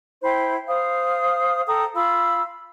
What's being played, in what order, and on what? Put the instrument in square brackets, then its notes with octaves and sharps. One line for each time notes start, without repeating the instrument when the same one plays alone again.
[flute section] E4 C5 G5 B5
C5 F5 D#6
A4 G5 A#5 D#6
F4 F5 B5 E6